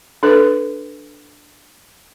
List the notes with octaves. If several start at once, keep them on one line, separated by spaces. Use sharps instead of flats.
D4 A4 B4